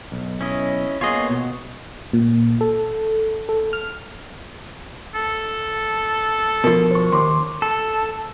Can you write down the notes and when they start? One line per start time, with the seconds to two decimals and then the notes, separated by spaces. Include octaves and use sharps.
0.12 B1
0.41 C#4 E4 D#5
1.01 A#3 B3 F4 G#4 C#5 D#5
1.30 B2
2.13 A#2
2.61 A4
3.49 A4
3.73 F6
5.15 A4
6.64 B2 F3 A#4
6.91 C5 C#6
7.12 D#2 C6 D6
7.62 A4